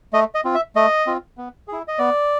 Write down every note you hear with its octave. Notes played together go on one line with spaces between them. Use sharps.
A3 D#5
D#5
C4 F4
E5
A3 D#5
C4 F4
B3
E4 G#4
D#5
B3 D5